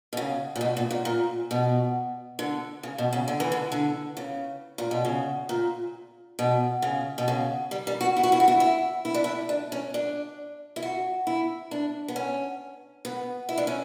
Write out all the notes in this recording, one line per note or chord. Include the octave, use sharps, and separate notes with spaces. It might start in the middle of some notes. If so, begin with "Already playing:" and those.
B2
C#3
A#2
B2
A#2
A#2
A#2
B2
D3
C#3
B2
C#3
D3
E3
D3
D3
C#3
A#2
B2
C#3
A#2
B2
C#3
B2
C#3
G3
G3
F#4
E4
F#4
E4
F#4
E4
E4
E4
D4
E4
D4
C#4
D4
E4
F#4
E4
D4
B3
C#4
B3
E4
D4
C#4